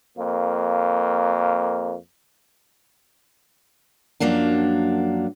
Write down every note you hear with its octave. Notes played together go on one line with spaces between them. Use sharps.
F2 A#3
F#2 F3 F#3 A#3 D4